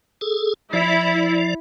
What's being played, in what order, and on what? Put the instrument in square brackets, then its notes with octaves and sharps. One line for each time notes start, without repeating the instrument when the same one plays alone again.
[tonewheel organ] G#4 A4
[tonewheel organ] F3 D5 [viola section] E4